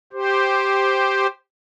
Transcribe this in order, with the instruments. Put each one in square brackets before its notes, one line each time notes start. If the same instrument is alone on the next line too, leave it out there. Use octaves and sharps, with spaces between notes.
[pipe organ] G4 C5